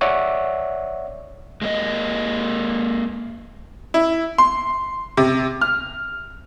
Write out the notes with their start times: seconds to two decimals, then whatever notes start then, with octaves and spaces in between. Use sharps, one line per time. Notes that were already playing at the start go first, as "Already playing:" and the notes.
0.01 C#5 D5 E5 F#5 C#6
1.62 G#3 A#3 D4 D#5
3.94 E4
4.38 C6
5.17 C3
5.61 F6